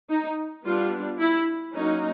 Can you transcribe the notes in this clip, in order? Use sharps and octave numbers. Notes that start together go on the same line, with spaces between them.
D#4
G3 B3 D4 F4
E4
F#3 A#3 C#4 D#4